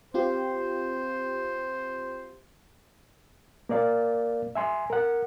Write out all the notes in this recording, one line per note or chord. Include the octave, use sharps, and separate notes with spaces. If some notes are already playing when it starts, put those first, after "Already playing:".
C4 F4 G4 C5
A#3 A#4 D5 F5
E5 G#5 C6
A#4 F#5